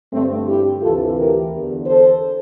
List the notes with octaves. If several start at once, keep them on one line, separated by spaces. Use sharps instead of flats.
G2 D3 A3 C4
E4 G4
D2 C3 E3 F4 A4
G4 A#4
E2 D3
A4 C5